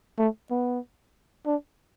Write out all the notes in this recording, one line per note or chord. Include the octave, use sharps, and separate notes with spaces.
A3
B3
D4